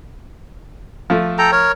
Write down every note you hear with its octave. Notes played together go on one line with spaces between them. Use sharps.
F3 A3
A4 G5 A#5
A#4 C#5